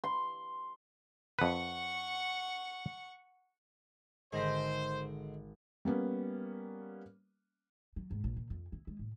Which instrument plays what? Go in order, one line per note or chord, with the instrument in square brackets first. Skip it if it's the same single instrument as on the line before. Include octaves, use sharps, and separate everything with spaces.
[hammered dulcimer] C6
[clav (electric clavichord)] F2 B4 [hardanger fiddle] F#5 C#6
[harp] G#1 A#6 B6 [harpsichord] D3 G#3 [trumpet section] C5
[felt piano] G3 A#3 B3 C#4
[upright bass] F#3
G#2
A#1
A#2
F2
E4
G#3
A2